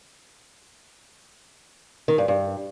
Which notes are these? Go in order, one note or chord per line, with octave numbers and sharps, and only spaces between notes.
D#3
G2
G2